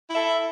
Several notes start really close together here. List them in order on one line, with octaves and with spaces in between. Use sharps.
E4 E5 A4